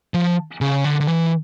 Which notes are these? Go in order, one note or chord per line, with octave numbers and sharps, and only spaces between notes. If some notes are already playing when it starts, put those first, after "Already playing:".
F3
C#3
D3
D3
E3